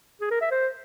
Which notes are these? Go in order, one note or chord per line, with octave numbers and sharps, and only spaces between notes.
G#4
A#4
E5
C5